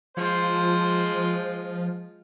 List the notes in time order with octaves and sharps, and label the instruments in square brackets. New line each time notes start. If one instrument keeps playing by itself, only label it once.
[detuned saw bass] F3 [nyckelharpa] G#3 F4 [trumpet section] C5